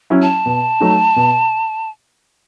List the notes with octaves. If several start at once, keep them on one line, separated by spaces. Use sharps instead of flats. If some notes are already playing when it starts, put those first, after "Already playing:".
F#3 C#4 E4
A5
B2
F#3 A3 D#4
B2